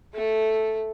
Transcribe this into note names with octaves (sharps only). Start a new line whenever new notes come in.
A3 A4